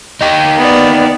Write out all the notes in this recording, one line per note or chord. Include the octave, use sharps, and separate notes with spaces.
D#4 G4
B3 D5